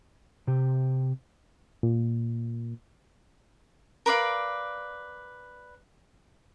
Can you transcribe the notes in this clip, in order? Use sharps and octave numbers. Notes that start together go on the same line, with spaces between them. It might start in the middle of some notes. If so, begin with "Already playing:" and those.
C3 G4
A#2
A#4 B4 D5 F5